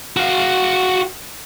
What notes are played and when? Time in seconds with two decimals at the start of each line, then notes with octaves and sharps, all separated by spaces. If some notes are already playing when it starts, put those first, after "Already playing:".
0.17 F#4 F5